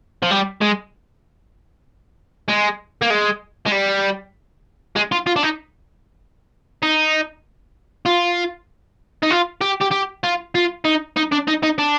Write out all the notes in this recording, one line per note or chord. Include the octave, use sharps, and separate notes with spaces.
F3
G3
G#3
G#3
A#3
G#3
G#3
G3
G#3
F4
F4
D4
D#4
D#4
F4
D#4
F4
G4
G4
G4
F4
F4
D#4
D#4
D4
D#4
D#4
D4